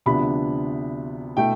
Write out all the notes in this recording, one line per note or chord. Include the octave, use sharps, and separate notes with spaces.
D2 C3 F3 B3 D4 B5
B2 A3 E4 G5